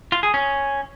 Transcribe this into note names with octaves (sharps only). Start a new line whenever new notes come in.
F4
G#4
C#4